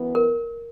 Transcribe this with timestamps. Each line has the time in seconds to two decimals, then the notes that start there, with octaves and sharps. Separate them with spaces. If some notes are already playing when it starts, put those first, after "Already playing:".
Already playing: F#2 E3 B3
0.15 A#4